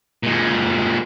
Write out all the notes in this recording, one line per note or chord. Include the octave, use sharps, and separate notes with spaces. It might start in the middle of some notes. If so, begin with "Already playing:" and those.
A#2 G#3